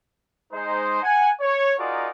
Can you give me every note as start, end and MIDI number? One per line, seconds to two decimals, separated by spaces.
0.52 1.00 56
0.52 1.00 63
0.52 1.00 72
1.03 1.30 78
1.03 1.30 80
1.40 1.74 73
1.78 2.09 63
1.78 2.09 65
1.78 2.09 66
1.78 2.09 68
1.78 2.09 70
1.78 2.09 74